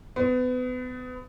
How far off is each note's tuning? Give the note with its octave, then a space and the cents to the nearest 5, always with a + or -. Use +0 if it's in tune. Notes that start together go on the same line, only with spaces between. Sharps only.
B3 +30